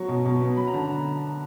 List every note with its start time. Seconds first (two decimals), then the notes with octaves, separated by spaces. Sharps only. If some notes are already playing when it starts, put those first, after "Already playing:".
Already playing: F#3 C#6
0.09 B2
0.25 B2
0.41 B3
0.57 F#3 B5
0.67 A#5
0.74 D3 A5